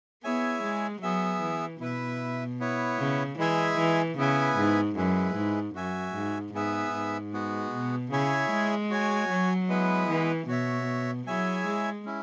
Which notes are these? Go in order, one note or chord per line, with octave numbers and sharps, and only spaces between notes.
B3 E4 G#4 C#5 E5 G#5
G#3
F#3 B3 G#4 E5
E3
B2 E4 B4 E5
B3 E4 C#5
C#3
E3 G#3 E4 G#4 E5 G#5
E3
C#3 B3 E4 B4 G#5
G#2
F#2 G#3 E4 G#4 B4
G#2
F#2 F#4 E5 G#5
G#2
G#2 B3 G#4 B4 E5
G#2
G#3 B3 F#4
B2
C#3 E4 G#4 C#5 E5 G#5
G#3
F#4 C#5 G#5
F#3
G#3 B3 E4 B4
E3
B2 F#4 C#5 E5
F#3 E4 G#4 C#5 E5 G#5
G#3
C#4 E4